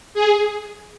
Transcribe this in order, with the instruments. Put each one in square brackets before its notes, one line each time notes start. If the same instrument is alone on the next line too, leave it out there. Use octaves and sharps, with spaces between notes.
[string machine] G#4